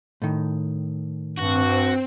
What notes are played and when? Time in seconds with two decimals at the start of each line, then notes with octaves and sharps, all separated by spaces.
0.22 A2 D#3
1.38 G2 C4 F#4